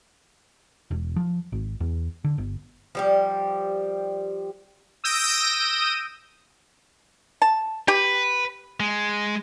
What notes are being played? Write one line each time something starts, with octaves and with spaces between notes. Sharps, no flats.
E1
F3
G#1
E2
D3
G1
F3 G3 G4
D#6 E6 G6 A#6 D7 D#7
A5
G4 B4
G#3